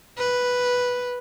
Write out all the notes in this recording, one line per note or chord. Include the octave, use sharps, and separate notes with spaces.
B4